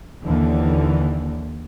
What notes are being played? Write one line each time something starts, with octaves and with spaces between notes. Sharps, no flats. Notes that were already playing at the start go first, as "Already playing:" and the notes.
D#2 D3 E3